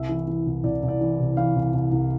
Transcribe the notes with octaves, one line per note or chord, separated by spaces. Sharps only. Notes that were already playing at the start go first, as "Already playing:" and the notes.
Already playing: C2 E5
E3
E3
C2
C2 D5
C2
D5
E3
C3
E3 F5
C2
C2
C2